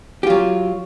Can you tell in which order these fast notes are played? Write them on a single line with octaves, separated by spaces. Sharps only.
G4 F4 F#3